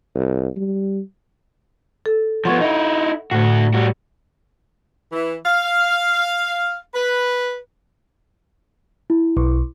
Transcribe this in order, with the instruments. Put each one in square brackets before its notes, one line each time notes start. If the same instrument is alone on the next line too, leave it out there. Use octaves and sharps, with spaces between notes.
[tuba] C2
G3
[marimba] A4
[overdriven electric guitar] F3 B3 [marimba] F#5 C#6 G#6
[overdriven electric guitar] D#4 E4
[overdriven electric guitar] D2 F#4 [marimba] A2 A3
[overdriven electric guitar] G3 F#4
[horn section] E3
F5
B4
[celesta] E4
[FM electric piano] B1